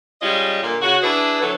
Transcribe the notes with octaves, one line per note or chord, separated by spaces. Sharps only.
G3 G#3 C#4 F4 D#5
A#2 D3 A#3
C#3 F#4
D4 E4 G#4 B4
D2 E3 F#3 F#4 A4